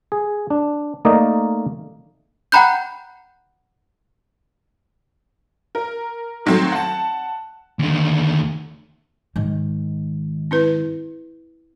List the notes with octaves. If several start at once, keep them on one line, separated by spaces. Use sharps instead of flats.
G#4
D4
A3 A#3 D#4 A#4 D5 D#5
F#5 G5 A#5 B5 F#6 G6
A#4
D#3 F#3 A3 C4
F#5 A5
D#2 D3
G#2 D#3
C4 E4 B4